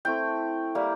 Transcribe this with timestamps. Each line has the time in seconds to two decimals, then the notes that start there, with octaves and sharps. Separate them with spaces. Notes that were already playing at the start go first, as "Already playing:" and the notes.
0.05 A3 C4 E4 G5
0.75 G3 A#3 E4